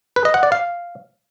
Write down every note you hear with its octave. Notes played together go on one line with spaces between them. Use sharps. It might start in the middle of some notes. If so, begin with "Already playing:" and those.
B4
D#5
F#5
D5
F5